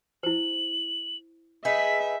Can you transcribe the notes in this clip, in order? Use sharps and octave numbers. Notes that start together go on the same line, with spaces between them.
E4 C5 F#7
D#4 G#4 B4 E5 B6